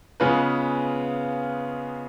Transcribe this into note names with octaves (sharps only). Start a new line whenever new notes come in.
C#3 G#3 B3 F4 B4